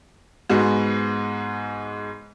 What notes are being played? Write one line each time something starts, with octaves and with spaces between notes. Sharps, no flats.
G#2 G#3 B3 F#4